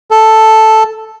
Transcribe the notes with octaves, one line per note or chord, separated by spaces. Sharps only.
A4